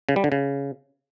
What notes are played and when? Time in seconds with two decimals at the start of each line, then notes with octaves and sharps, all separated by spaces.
0.09 C#3
0.16 G3
0.24 D3
0.32 C#3